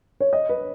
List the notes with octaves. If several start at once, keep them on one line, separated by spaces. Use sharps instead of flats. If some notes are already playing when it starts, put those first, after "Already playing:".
C#5
D#5
B4